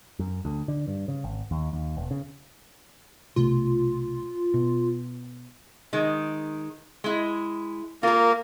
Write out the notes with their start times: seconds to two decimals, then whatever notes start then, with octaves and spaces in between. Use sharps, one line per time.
0.19 F#2
0.45 D2
0.68 D3
0.88 G2
1.08 C#3
1.24 G#1
1.51 D#2
1.73 D#2
1.97 E1
2.11 C#3
3.36 B1 C3 A3 F4
4.54 B2
5.93 D#3 G#3
7.04 G#3 E4
8.03 A#3 F4 A#4